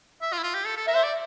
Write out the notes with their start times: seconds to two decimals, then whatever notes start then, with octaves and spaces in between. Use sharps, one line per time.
0.22 E5
0.33 F4
0.38 E4
0.43 F4
0.54 G4
0.66 A4
0.77 A4
0.87 A#4 E5
0.95 C5
1.04 D5